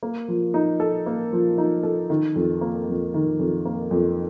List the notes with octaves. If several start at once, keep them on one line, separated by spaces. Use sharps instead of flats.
A#3
F3
D#4
A4
A#3
F3
D#4
A4
D#3
F2
A#3
F2
D#3
F2
A#3
F2